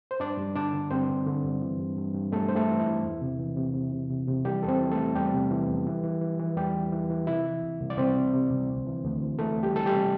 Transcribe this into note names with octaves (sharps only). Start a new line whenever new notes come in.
C5
G2 D4 D5
G2
D3 D4 D5
D3
G2 C4 C5
D3
D3
G2
E3
G2
G2
G2
G2 A3 A4
G2 C5
A3 A4
E3
E4
G2
E2
C3
E3
C3
C3
C3
C3
C3
E3 G3 G4
E2 A4
C4 C5
E3
A3 A4
E3
E2 G3 G4
C3
E3
E2
E3
E3
E3
E3
E2 G3 G4
E3
E3
E3
C3 E4
E3
C2
C2
D5
C2 C4 C5
C3
C3
C2
D2
E3
D2
E3
E3 A3 A4
D2
G3 G4
E3 A4
G3 G4
C3